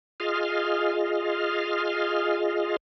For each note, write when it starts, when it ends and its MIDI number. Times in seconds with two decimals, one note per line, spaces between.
0.20 2.76 65
0.20 2.76 68
0.20 2.76 75
0.20 2.76 89